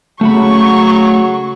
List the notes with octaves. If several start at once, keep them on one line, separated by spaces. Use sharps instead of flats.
C#3 F#3 A3 F#4 B5 C#6